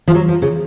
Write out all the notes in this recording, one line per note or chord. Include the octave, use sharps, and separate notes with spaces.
F3
F#3
F3
C#3